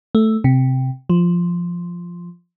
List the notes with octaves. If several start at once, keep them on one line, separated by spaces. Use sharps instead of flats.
A3
C3
F3